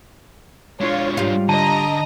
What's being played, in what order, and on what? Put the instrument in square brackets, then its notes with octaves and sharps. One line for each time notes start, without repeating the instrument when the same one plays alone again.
[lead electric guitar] G#3 D4 [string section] F4 C#5
[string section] G#2 [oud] G3 F4
[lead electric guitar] D3 [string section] D#5 A#5 [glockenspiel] A5 D#7